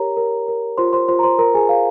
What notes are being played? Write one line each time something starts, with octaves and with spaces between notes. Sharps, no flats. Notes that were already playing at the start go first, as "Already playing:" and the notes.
Already playing: G4 A#4 C#5 A#5
A#4
A#4
F4 C5 C6
C5 C6
F4 C5 C6
A#5
C5 C6
A#4 C5 A#5
G#4 G#5
C5 F5